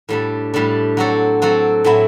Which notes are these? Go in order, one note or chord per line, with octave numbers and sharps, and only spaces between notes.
A2 G3 D4 A4
A2 G3 D4 A4
F#3 C4 F#4 A4
F#3 C4 F#4 A4
A2 F#3 C4 E4